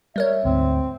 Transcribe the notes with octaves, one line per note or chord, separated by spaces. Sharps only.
G3 A#4 C#5 E5
D2 G#2 C4